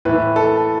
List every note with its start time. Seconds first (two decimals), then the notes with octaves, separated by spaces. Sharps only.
0.05 A2 E3 B4
0.36 A4